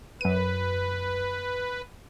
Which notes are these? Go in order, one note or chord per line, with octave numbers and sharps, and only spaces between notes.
F#2 B4 D#7